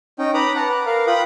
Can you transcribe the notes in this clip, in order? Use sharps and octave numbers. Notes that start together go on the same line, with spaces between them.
C#4 D#4 G5
B4 A#5 B5 D6 D#6
F#5 A5 A#5
B4 D6
A#4 F5
F4 B4 G5 B5 D#6